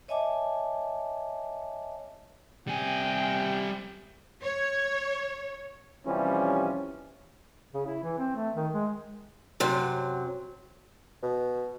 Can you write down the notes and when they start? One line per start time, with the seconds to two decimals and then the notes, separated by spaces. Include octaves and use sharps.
0.08 C#5 D#5 E5 G#5 A5 D6
2.68 C3 G3 G5 G#5
4.42 C#5
6.06 C3 E3 F3 G3 C#4
7.74 C#3
7.86 E4
8.04 E3
8.18 C4
8.35 A3
8.55 D#3
8.74 G#3
9.60 F#2 C3 F#3
11.23 B2